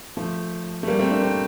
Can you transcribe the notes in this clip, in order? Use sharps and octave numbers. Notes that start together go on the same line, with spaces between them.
F3 A3
A3
G3 A#3
A3 C4
A#3 D4
A3 C4